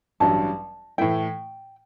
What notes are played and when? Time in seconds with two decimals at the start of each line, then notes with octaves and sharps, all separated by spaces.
0.20 A1 G2 F#3 A5
0.98 A2 E3 A3 E4 G5